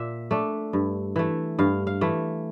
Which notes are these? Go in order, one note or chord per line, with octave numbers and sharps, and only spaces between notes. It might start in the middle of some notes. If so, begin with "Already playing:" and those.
Already playing: A#2 E5
A3 D4
G2
E3 A3
G2 F5
F5
E3 A3